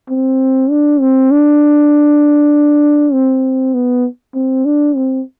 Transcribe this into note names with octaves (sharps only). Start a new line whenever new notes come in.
C4
D4
C4
D4
C4
B3
C4
D4
C4